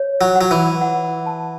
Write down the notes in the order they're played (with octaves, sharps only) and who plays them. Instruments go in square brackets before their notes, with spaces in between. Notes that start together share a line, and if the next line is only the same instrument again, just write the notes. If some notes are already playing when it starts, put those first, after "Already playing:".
Already playing: [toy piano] C#5
[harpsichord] F#3
[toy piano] F#5
[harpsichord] F#3
E3
[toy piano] F#5
A5